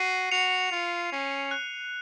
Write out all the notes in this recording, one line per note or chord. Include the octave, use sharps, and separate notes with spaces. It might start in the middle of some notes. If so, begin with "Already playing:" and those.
Already playing: F#4 C7 D#7
F#4 C#7 F7
F4
C#4
F#6